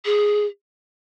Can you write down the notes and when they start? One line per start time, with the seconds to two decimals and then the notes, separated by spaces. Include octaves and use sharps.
0.05 G#4